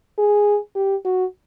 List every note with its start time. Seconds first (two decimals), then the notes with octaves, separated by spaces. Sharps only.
0.18 G#4
0.76 G4
1.05 F#4